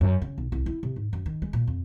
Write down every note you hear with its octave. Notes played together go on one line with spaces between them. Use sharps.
F#2
C#3
B1
C2
E4
C3
G#2
F#2
D#3
G#3
A#2
F2